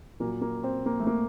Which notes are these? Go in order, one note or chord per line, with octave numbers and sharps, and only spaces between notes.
A#2 F#3 A#3
A#3
C4
A#3
A3
A#3